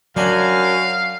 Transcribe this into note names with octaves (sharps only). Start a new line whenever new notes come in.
F#2 F#3 D4 D5 F5 G#5